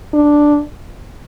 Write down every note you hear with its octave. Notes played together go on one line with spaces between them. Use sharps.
D4